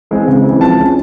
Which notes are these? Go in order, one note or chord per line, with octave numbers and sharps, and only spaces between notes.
E3 G#3 C4
C#3
E3 G#3 C4
F3 A5
G#3 C#4